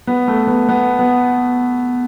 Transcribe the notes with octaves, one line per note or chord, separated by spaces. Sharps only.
B3
A3
B3
B3
B3